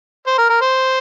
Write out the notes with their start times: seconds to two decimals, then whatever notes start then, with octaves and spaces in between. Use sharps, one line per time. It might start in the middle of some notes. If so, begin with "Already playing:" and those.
0.27 C5
0.38 A#4
0.49 A#4
0.61 C5